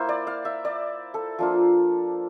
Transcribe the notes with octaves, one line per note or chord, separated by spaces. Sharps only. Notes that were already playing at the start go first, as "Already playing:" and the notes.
Already playing: A#3 E4 C5
D5
F5
E5
D5
A4
F3 A#3 D4 F4